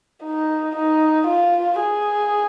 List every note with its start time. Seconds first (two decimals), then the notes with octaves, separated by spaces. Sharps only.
0.24 D#4
0.76 D#4
1.27 F4
1.79 G#4